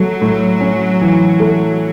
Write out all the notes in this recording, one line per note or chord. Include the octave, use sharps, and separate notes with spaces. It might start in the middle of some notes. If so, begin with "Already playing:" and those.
Already playing: F#3 A3
A2
C#4
E3
A3